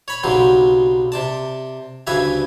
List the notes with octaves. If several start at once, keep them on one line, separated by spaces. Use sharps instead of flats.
C#5 B5
B1 C#3 F#3 G3 C4
C3 D5 A5
D2 G2 C#3 B4 E5 G#5